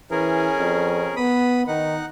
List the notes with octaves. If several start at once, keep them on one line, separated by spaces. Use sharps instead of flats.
E3 C#4 G#4 A#4
F2
B3 B5 D#6
D#3 D#4 F#5